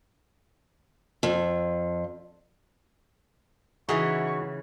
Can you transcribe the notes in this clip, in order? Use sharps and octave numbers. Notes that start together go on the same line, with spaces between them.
F2
C#3 E3 D#4 F#4 G#4 E5 F#5 C#6